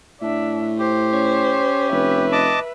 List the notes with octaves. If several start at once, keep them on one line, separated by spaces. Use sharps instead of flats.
A2 D4 E5
G4 C5
C#4
F1 B4 E5
D#5 A5 D6